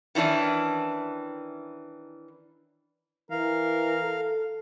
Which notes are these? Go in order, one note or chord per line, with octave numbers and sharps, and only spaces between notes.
D#3 E3 C#4 D4 E4
E3 A#4 F5
A4